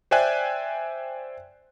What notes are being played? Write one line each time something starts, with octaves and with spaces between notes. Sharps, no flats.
C5 D5 E5 G5 G#5 F#6